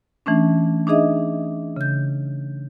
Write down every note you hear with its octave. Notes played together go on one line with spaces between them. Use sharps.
E3 A3 C#4 D4
D4 D#4 G#4 D#5 E5
C#3 G6